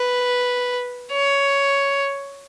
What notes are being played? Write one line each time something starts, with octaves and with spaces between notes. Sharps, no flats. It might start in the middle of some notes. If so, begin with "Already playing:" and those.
Already playing: B4
C#5